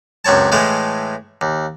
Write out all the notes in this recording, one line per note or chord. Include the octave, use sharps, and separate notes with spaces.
C#2 F#2 C4 C#5 A5
A2 E3 G#3 A3 F5
D#2